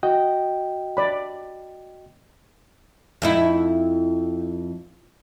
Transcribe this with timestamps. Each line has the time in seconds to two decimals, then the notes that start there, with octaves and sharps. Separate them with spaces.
0.03 F#4 D#5 G5
0.97 D5 B5
3.22 F2 D#4 E4